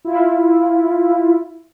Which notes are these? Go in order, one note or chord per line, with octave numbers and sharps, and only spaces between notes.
E4 F4